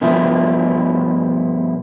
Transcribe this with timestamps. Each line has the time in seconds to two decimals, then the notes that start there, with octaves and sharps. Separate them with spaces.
0.01 G2 B2 F3 E4